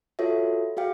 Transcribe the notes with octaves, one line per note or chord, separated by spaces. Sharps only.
F4 F#4 A4 C#5 E5
F#4 G#4 F5 G5